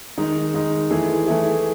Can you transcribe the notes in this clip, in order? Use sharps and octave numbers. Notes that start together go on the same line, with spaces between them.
D#3 G#3 D#4
D#3 G#3 D#4
E3 A3 E4 G#4
E3 A3 E4 G#4